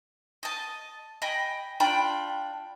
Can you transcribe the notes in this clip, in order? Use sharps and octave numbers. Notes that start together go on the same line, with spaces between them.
D#5 A5
D#5 G5 G#5 B5
D4 F4 G5 B5